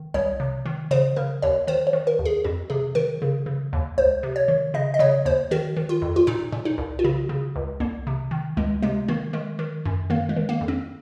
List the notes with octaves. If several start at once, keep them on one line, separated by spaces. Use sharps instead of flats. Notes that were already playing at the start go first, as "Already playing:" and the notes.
Already playing: D#3
C2 C#5
C3
D#3
C#3 C5
C#3 A#4
D#2 C#5
D#3 C5
C5
D#3
A#4
D#2
G#4
F2 F#4
C3 G#4
D#3 A#4
C#3
C#3
D#2
C#2 C5
C3
C#5
D#3
C#3 D#5
D#5
C#3 C#5
D#2 C5
D#3 F#4
D#3
F4
F2
F4
A#2 D#4
A#2
D#4
C2
F4
C#3 F#4
C#3
C#2
C2 A#3
C3
D#3
C#2 G#3
C3 G#3
D#3 A#3
D#3 G#3
D#3
F#2
D#3 A#3
G#3
D#3
A#3
F2
C4